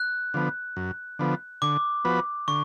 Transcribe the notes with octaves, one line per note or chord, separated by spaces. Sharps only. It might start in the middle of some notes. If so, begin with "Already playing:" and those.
Already playing: F#6
D3 F3 B3
F#2
D3 F3 B3
D3 D6
F3 B3 F#4 B4
D3 C#6